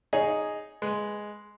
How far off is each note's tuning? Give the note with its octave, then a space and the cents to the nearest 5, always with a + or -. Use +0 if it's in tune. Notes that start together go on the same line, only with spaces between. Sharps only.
D#4 +0 G#4 +0 C#5 +0
G#3 +0 B4 +0